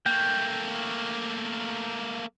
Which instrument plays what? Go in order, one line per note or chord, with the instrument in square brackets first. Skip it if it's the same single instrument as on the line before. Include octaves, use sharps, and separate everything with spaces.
[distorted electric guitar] A3 A#3 [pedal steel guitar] G5